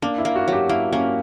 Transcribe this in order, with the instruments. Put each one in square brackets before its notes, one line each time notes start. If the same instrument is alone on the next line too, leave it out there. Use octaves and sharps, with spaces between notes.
[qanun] A#3 [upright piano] D4
[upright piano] E4
[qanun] A#3
[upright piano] F#4
[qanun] F#3 [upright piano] G4
[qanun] A#3 [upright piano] E4
[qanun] A#3 [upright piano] C#4